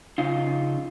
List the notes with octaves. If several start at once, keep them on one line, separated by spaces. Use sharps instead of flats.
C#3 D#4 F4